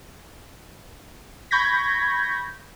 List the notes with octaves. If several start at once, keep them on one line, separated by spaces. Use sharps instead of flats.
B5 C#6 G6 G#6 A#6 B6